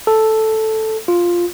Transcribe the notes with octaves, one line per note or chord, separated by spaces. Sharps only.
A4
F4